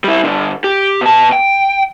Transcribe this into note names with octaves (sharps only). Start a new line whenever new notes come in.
G3 E4
G2 D3
G4
B2 A5
G5